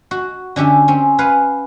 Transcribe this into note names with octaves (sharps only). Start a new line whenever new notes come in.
F#4
D3 C#4 G4 E5
C4 C#4
B4 F5 F#5 G#5